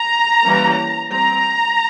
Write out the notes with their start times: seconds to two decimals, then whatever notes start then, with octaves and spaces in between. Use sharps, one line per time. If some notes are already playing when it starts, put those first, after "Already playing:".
Already playing: A#5
0.45 E3 G3 A#3 C#4
1.11 G3 C4 A#5